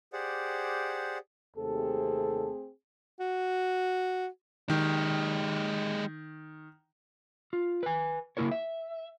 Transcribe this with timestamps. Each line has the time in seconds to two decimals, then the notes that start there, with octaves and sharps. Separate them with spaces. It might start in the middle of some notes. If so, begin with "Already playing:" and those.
0.13 G4 G#4 C5 D5 F#5
1.57 D#2 C3 A3 C4 G#4 A4
3.20 F#4
4.69 D#3 G#3 G4
7.53 F4
7.83 B4 G#5
8.37 C#3 A#3 C4 E4 A#4 C#5
8.51 E5